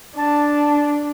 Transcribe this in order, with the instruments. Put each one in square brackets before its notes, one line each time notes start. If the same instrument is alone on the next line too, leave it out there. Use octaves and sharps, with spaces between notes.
[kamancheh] D4 [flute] A5